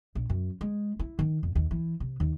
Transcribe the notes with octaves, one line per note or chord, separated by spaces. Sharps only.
A#1
F#2
G#3
E4
D#3
F2
D#2
E3
C3
D#2